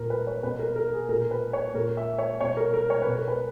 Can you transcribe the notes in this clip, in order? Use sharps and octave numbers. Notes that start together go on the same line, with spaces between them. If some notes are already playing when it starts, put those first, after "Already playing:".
Already playing: A#2 A#4
B4
C#5
B2 B4
A#4
A#4
G#4
A#2 A#4
B4
C#5
A#2 A#4
E5
C#5
B2 C#5
A#4
A#4
C#5
B2 B4
A#4
B4